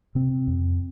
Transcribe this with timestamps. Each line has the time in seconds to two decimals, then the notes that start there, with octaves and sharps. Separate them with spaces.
0.15 C3 C4
0.47 F2